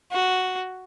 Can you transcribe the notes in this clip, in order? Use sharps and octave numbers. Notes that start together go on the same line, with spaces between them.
F#4